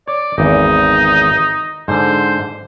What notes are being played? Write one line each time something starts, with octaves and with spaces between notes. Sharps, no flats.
C#5 D5
G#1 E2 D#4
G#2 D3 C5